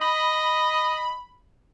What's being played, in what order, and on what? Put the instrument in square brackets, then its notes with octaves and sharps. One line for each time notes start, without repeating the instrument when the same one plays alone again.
[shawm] D#5 [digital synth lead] B5